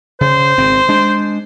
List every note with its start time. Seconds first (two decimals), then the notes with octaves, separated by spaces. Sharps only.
0.21 C#3 C5
0.58 G#1 C4
0.89 G#3 D4